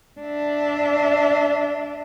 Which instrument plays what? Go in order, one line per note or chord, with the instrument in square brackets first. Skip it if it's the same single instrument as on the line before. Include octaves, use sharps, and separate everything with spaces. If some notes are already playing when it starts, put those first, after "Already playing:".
[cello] D4 E5